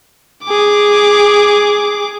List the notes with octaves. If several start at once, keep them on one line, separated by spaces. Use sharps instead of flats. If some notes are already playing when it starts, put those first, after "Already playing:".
G#4 D6